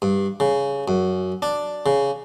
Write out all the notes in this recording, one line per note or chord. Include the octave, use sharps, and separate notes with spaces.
G2
C#3
F#2
D4
C#3